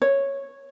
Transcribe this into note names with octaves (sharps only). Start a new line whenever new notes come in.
C#5